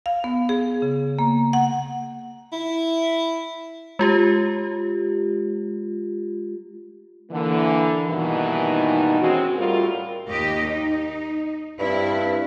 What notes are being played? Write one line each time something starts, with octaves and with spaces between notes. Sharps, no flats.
F5
B3
G#4
C#3
A#3
F#5
E4
G#3 F4 G4
D3 E3 A#3
G2 B2 D#3 E3 A#3 D#4
G#3 C4 C#4 F#4
A2 G3 F4 A#4
D#2 G4 D#5
D#4
G2 C4 E4